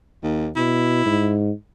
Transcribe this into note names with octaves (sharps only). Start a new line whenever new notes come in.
D#2
B2 E4
G#2